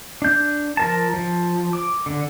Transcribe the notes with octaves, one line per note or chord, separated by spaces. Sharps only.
D4 G6
F3 A#4 A5
F3
D6
D3